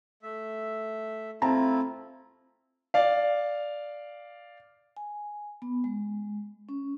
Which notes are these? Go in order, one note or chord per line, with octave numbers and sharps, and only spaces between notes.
A3 E5
A3 C4 E4 F4 A5 A#5
D5 F5
G#5
B3
G#3
C#4